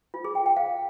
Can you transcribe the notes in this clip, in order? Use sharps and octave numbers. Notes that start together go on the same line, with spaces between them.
F4
G#4
G5
G5
F5